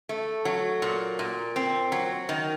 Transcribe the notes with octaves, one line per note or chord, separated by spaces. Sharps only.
A3
F#3
A#2
A#2
C4
F#3
D#3